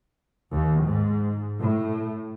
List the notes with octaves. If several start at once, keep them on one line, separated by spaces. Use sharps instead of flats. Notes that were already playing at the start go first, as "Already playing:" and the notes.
D#2
G#2
A2